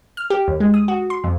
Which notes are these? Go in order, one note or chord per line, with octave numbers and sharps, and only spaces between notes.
F6
G4
D#2
G#3
D#6
F#4
C6
F2